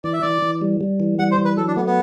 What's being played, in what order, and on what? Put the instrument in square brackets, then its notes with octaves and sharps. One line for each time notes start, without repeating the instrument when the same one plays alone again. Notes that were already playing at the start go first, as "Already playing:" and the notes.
[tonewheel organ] E3 [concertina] D5
[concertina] E5
[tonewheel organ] E3 [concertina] D5
[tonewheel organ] E3
G3
G3
E3
[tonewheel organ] G3 [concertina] F#5
[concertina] C5
[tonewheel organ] E3
[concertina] B4
[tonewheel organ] F#3 [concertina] A4
[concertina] D4
[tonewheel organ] A3 [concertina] B3
[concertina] B3